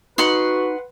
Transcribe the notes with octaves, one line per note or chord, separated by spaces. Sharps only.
D#4 F#4 B4 F#5 C6